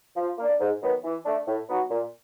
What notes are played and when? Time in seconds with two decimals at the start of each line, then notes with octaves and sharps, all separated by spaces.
0.17 F3
0.38 A#3 D4
0.60 G#2
0.82 D#3 F#3 B3
1.04 E3
1.26 A3 D4
1.48 A2
1.69 F#3 B3 D#4 F#4
1.90 A#2